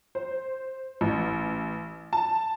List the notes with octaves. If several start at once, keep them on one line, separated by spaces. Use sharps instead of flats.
C5
A1
A5